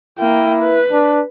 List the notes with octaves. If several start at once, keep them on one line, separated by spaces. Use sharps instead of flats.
A#3 E4 G5
B4
D4